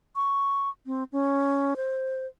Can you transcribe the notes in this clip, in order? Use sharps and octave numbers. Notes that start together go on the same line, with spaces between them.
C#6
C4
C#4
C5